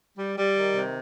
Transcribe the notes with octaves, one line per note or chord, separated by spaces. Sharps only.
G3
G3
D#3
C3